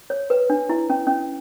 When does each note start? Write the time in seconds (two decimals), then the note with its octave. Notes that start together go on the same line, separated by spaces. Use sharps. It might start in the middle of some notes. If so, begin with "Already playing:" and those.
0.10 C#5
0.30 B4
0.50 D4
0.69 E4
0.90 C#4
1.07 C#4